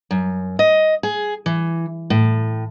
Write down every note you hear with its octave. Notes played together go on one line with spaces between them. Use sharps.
F#2
D#5
G#4
E3
A2